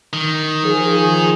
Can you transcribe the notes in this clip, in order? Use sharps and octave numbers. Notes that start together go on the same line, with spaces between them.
D#3
F3 G#4